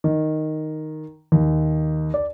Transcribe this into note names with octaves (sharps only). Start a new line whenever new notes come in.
D#3
D#2
D5